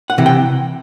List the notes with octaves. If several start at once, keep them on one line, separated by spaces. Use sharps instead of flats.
F#5
C3 E3
G5